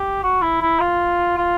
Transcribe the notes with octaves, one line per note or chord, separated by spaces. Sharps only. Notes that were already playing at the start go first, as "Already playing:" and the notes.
Already playing: G4
F#4
E4
E4
F4
F4